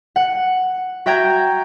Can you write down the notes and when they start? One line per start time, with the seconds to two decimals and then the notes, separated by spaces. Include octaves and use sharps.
0.16 F#5
1.06 F#4 E5 G5 A#5 G6 G#6